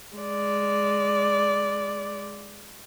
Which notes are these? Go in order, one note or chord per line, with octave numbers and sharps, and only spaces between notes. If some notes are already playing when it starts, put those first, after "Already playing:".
G#3 D5